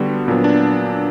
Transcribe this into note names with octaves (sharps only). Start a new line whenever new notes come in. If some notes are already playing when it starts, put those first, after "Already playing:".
Already playing: D3 G3 B3 F#4
A#2 F#3 B3 D4
D4